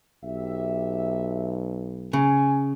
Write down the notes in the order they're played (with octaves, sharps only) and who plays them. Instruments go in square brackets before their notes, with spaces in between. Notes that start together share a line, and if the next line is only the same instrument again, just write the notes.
[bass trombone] B1 [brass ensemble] G4 E5
[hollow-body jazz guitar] C#3 [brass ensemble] G#5